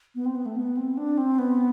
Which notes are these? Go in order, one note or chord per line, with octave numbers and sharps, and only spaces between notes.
B3
C4
B3
A3
B3
C4
D4
C4
B3